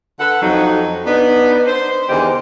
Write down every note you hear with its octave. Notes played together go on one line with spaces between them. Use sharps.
D3 A4 B4 F#5
F2 F#3 D#4
B3 D4 D#4
C5
E2 D3 D#3 G4 C5 D#5